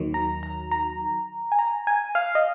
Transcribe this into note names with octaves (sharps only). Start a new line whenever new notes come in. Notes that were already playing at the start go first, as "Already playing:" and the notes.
Already playing: D#2 D#3 F#3
A#5
A#5
A#5
G#5
A#5
G#5
F5
D#5